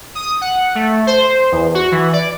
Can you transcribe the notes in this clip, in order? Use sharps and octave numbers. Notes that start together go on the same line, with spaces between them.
D#6
F#5
A3
C5
E2
F#4
E3
D5